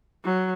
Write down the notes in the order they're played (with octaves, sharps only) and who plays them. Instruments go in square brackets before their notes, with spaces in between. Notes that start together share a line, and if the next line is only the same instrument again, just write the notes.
[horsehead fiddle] F#3